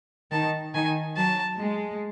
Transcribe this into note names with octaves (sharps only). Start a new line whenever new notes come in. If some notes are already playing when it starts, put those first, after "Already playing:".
D#3 A5
D#3 G#5
F#3 A5
G#3